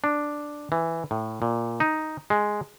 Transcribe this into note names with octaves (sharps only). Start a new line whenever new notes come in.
D4
E3
A2
A#2
D#4
G#3